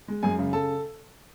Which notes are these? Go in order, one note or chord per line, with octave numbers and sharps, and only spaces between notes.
G#3
F#2 G#4 G#5
C#3
A4 A5